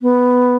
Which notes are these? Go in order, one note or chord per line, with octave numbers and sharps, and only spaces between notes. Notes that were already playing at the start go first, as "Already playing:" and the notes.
B3